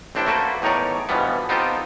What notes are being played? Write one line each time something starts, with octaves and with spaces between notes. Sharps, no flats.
A1 C4 D4 E4 A4 G5
A3 A#3 F#4 A4 B4 C5
E2 A2 D#4 A#4 C#5 D5
G2 B2 E3 F3 G3 B3
B3 C4 D#4 F4 G4 A4